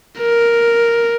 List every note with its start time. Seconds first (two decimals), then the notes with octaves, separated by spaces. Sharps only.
0.19 A#4